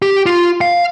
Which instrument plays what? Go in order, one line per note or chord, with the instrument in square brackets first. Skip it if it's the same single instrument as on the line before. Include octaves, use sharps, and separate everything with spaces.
[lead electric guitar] G4
F4
F5